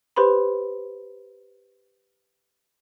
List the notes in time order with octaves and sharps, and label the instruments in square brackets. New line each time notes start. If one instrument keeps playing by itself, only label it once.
[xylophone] G4 B4 C5 B5 C6